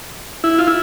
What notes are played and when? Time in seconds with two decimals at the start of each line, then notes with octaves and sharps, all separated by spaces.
0.44 E4
0.58 F4
0.67 E4